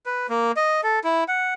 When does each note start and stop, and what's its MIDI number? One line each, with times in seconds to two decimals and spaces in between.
0.06 0.27 71
0.29 0.52 58
0.57 0.81 75
0.83 0.99 69
1.04 1.24 64
1.28 1.54 78